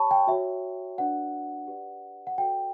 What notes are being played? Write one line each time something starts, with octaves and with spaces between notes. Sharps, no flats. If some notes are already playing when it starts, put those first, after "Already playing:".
Already playing: G4 C#5 A5 B5 C#6
G5
F#4 C#5 E5
D4 F#4 B4 D5 F#5
G4 B4 D5
F#5
F#4 A4 C#5 G5